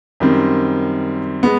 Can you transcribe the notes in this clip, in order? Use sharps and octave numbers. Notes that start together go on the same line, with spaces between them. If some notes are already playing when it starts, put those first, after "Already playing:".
F#2 D#3 G3 C4
G#3 B3